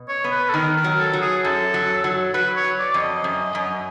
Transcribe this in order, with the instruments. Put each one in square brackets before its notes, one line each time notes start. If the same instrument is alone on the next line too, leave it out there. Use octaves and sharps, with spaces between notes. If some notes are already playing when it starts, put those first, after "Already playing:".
Already playing: [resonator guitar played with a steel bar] B2
[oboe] C#5
[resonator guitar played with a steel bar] B3
[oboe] B4
A4
[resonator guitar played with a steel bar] D#3 [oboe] A#4
[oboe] A#4
[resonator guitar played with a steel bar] F#3
[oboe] A4
[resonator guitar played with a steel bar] F#3
[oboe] G#4
[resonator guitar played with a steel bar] F#2 [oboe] A4
[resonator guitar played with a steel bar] F#3
F#3
[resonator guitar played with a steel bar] F#3 [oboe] B4
[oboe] C#5
[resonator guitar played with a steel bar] F#3
[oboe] D5
[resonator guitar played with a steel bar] F2
[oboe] D#5
[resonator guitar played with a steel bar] F#2
F#2